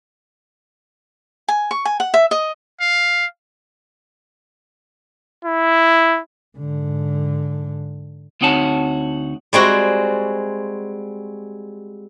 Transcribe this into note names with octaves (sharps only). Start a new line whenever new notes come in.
G#5
C#6
G#5
F#5
E5
D#5
F5
E4
G#2 D3
D2 C4 D#4 F#4 C#5 A5
G3 G#3 C4 F#4